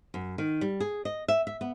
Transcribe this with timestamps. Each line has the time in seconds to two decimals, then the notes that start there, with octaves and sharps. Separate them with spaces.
0.14 F#2
0.38 D#3
0.61 G3
0.80 G#4
1.05 D#5
1.28 E5
1.47 E5
1.61 B3